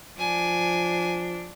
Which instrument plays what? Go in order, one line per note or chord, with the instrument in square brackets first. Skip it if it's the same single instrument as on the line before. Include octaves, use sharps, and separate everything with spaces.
[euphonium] F3 [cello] D4 [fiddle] G#5